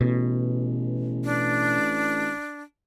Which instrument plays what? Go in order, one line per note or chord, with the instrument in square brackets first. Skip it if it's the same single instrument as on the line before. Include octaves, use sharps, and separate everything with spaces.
[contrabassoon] A1 [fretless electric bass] B2
[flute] D4